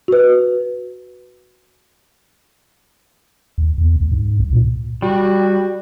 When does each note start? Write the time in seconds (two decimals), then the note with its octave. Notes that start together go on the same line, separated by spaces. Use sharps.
0.08 F#4 B4
3.58 D#2
3.78 E2
3.96 D2
4.11 G#2
4.39 C2
4.53 A#2
5.02 G3 F#4